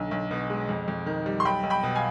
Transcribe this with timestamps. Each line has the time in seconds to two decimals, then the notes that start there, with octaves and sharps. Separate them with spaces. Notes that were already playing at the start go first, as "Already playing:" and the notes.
Already playing: B1 D3
0.11 B1
0.31 B2
0.50 G#3
0.69 F2
0.88 F2
1.06 D#3
1.26 G3
1.40 C6
1.45 B1 G5 B5
1.63 B1
1.70 G5 B5
1.83 B2
1.95 F5 G#5